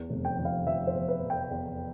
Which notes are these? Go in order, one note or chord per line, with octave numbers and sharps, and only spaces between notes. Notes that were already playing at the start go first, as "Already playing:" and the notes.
Already playing: E2
F1
G5
F3
F5
F3 E5
C5
E2
B4
F1
G5
E2